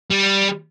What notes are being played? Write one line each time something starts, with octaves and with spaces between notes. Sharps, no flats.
G3